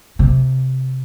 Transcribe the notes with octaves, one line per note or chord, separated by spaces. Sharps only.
C3